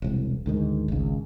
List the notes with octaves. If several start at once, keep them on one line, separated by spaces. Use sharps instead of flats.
E1 C2
D2 G#2 D#3
G#1 C#2